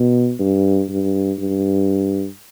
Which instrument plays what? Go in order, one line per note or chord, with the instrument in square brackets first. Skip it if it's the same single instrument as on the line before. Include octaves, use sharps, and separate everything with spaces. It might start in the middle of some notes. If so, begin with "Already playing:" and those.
Already playing: [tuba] B2
G2
G2
G2